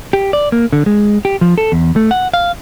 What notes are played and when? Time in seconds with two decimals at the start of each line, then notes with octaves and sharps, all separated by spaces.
0.13 G4
0.33 D5
0.52 A#3
0.73 D3
0.86 G#3
1.25 G4
1.41 F3
1.58 A4
1.72 E2
1.96 A3
2.11 F#5
2.34 F5